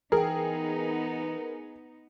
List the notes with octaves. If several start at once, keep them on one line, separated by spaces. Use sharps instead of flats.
E3 B3 D#4 G#4 A#4 G5